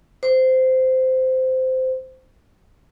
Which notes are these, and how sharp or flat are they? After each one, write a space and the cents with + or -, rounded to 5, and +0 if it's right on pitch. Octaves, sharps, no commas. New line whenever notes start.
C5 -15